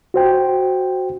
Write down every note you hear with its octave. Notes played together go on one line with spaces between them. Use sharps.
F#4 C5 G5